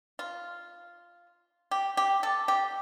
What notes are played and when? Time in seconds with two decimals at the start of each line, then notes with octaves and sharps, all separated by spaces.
0.19 F4
1.71 G4
1.97 G4
2.23 A4
2.48 G4